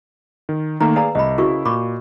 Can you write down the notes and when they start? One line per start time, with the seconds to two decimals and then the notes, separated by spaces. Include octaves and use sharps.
0.49 D#3
0.80 D#3 A3 A#3 A#5
0.96 G#4 B4 D5 F5 A#5
1.15 C2 D#5 B5
1.38 C#3 E4 F#4 A#4 C#6
1.65 A#2 B5 C#6 D6